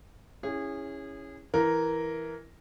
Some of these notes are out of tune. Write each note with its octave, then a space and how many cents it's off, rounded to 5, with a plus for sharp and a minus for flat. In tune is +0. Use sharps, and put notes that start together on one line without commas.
C#4 +0 E4 +0 G#4 -25
E3 +0 A#4 +0